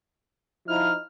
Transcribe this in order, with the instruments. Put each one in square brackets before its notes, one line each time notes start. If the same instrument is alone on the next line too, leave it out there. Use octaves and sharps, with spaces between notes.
[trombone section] F3 D#4 E4 [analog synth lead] F6